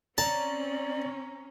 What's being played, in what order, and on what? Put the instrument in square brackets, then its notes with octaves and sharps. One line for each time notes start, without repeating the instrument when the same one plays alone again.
[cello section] C4 C#4 [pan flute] D5 [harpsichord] A5 [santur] A#5